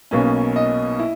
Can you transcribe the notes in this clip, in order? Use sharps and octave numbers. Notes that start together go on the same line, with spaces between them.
B1 B2 A#3 C#4
D#5
E4